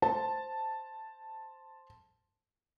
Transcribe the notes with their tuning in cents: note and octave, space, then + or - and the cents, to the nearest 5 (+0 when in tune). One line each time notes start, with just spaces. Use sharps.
C5 +0 A5 +0